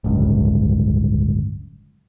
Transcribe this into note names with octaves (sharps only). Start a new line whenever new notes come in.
D1 G1 C#2